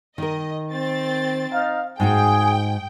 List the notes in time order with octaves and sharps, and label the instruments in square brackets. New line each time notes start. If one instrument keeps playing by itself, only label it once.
[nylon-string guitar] D#3 A#4 [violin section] D#5
[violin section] C4 A6
[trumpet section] D#4 F5
[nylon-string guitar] G#2 D#4 F#4 [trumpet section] G#4 [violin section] G5